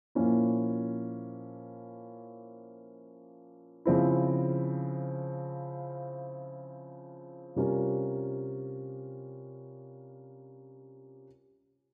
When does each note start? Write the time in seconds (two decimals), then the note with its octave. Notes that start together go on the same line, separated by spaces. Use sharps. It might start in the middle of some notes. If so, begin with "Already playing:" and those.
0.15 A#2 F3 A#3 C#4 E4
3.85 C#3 F3 C4 E4
7.56 C3 G3 C#4 F4 A#4